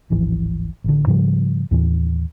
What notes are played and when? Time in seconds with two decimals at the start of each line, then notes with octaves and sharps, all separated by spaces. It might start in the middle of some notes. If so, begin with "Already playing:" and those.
0.10 D1 G#1 E3 F3
0.84 A1 D3
1.07 G#2 C#3 F3 G3
1.71 D#2 A2 E3